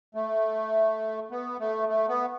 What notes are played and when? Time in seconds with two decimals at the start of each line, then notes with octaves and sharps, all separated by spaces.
0.15 A3
1.31 B3
1.60 A3
1.89 A3
2.08 B3